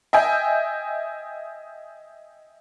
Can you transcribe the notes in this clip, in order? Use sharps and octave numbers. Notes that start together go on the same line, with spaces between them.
D#5 E5 G5 G#5